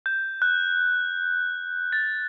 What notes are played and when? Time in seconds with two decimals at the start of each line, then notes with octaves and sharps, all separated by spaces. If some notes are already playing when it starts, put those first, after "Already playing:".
0.06 G6
0.42 F#6
1.93 A6